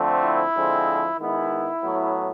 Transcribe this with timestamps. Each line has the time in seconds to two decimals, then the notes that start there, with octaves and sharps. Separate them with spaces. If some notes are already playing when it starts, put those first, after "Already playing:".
Already playing: D3 F3 A3 C4
0.24 E4
0.55 D3 F3 G#3 C4
1.18 D#3 G#3 B3 E4
1.83 A2 F#3 B3